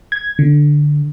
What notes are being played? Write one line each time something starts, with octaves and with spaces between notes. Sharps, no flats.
G#6
D3